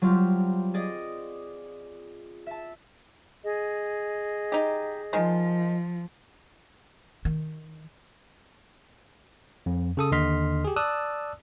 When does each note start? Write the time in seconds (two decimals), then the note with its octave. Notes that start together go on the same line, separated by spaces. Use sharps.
0.02 F#3 G3 C4 F4
0.74 G#4 D5 D#5
2.46 E5 A5
3.43 G#4 D#5
4.52 D#4 G4
5.13 D#3 F3 G#3
7.25 D#3
9.66 F2
9.97 C#3 A4 D#6
10.12 D#2 D3 D#5 C6 F6 B6
10.65 G4 G#4
10.76 D5 A5 D#6 E6 F#6